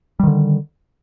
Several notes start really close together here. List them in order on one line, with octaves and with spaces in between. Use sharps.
G3 D#3 D3